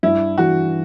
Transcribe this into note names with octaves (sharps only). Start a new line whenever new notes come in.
G2 E4
E3 F#4